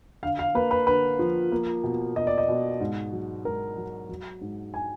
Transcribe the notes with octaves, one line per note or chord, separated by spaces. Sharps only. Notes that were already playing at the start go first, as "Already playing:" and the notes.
D3 F5
F5
A#3 B4
B4
D3 B4
F3
A#3
B2
B2 D#5
D5
D#5
B2
G#2
F#3
G#2 A#4
F#3
F#3
G#2
G#5